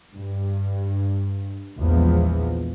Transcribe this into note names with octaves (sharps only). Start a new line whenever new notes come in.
G2
A#1 E2 E3 F3 G#3 B3